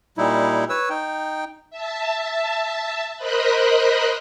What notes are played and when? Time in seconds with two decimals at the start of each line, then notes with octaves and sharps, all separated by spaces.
0.18 A#2 G3 D#4 E4
0.69 B4 C#5 E6
0.90 D#4 G5
1.70 E5 A5
3.17 A#4 C5 D#5 B5 F#6